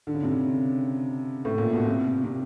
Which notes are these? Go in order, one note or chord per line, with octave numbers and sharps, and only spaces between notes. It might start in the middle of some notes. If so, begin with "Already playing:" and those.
D3
C#3
C3
C#3
A2
A#2
B2
C3
C3